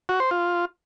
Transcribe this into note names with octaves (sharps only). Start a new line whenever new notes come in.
F#4
C5
F4